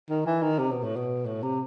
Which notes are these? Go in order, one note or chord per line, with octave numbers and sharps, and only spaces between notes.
D#3
E3
D#3
C3
B2
A2
B2
A2
C3